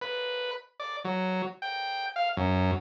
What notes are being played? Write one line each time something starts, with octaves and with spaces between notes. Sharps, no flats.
B4
D5
F#3
G5
F5
F#2